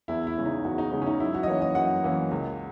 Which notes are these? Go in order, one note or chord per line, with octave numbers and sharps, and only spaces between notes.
E2 E4
E4
C#3 G#3 C#4
D#4
E2 F#4
D#4
C#3 G#3 C#4 D#4
C#4
D#4
F#2 E4
F#4
D#5
E3 A#3 C#4 C#5
D#5
F#2 F#5
E3 A#3 C#4
C#2